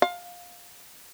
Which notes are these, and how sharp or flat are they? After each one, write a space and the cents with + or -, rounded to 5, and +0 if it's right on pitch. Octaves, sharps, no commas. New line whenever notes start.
F5 +20